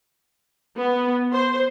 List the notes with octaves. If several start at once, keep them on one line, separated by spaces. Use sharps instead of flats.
B3
C5